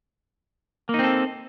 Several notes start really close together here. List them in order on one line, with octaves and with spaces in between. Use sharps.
A#3 D#4 C4 A4